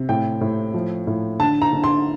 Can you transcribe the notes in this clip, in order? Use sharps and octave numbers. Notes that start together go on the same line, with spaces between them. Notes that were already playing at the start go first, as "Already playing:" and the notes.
Already playing: C3
A2 G5
A2
F3
A2
D3 A5
A#5
D3
C6